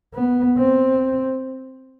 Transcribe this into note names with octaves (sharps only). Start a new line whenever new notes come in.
B3
C4